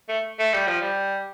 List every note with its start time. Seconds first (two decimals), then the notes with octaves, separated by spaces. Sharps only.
0.09 A3
0.39 A3
0.54 G3
0.68 F3
0.81 G3